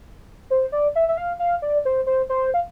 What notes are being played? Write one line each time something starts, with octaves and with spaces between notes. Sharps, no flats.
C5
D5
E5
E5
F5
F5
D5
C5
C5
C5
F5